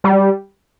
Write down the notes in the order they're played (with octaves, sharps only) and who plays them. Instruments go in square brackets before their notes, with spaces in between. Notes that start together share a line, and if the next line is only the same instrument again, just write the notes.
[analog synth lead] G3